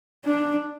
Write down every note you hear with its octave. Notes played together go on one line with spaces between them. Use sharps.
D4